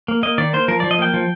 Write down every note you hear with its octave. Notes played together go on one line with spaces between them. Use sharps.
A#3
A#3 D#5
D#3 D5
A#3 C5
F3 A#4
D5
F3
D#5
A#3 G5
F3